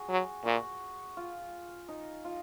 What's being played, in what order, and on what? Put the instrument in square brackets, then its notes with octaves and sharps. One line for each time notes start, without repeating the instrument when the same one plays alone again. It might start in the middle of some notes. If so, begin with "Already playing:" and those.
Already playing: [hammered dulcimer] F#4 G#4
[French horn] F#3
[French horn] A#2 [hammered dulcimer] F#4
[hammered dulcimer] F4
D#4
F4